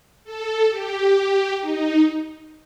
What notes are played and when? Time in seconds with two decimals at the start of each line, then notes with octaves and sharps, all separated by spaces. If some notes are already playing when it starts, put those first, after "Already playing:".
0.24 A4
0.70 G4
1.59 D#4